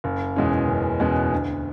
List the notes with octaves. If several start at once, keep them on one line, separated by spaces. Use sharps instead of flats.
F#1
E2 B2 G#3 C#4
F#1
E2 B2 G#3 C#4
D2